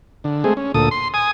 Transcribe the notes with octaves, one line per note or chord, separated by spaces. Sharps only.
D3
G#3 A3 C4 G#4
C#4
D2 A#2 A4 D#6
C6
G#5 D#6